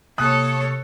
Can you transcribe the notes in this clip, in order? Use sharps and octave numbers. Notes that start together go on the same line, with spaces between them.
C3 A#3 A4 C#5 D#6 F#6